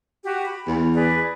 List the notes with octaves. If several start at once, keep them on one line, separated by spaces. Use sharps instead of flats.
F#4 G4
B5
E2
G#4 B4 D5